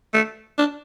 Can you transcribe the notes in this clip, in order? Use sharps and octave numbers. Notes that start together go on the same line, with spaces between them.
A3
D4